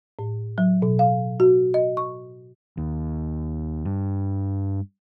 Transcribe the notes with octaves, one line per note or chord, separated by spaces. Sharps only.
A2
F#3
B2
F5
F#4
D#5
C#6
D#2
G2